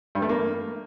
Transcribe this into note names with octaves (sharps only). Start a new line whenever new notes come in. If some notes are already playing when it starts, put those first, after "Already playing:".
G2
A3
A#3